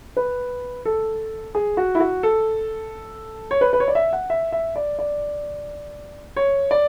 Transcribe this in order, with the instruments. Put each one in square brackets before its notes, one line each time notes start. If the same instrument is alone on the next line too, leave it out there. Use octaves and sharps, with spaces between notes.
[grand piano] B4
A4
G#4
F#4
E4
F#4
A4
C#5
B4
B4
C#5
D5
E5
F#5
E5
E5
D5
D5
C#5
D5